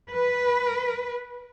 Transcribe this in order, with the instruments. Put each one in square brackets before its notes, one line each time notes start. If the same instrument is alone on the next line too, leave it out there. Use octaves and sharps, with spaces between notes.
[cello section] B4